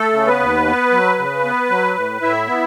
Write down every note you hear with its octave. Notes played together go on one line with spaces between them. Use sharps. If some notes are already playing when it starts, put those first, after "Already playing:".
Already playing: A3 A4
C#3
B3 B4
D#2
B3
F#3
C#3
B3
F#3
A2
A2 E4 E5
B3